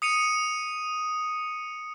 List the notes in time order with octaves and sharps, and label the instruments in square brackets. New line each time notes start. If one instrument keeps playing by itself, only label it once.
[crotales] D#6 C#7 D#7 F7